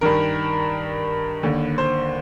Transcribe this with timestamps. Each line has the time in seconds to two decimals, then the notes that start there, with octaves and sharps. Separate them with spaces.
0.01 G2 D#3 A#4
1.43 D#2 D3
1.78 C5